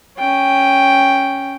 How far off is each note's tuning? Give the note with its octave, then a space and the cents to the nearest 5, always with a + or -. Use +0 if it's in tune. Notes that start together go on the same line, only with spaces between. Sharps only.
C#4 +0 G5 +0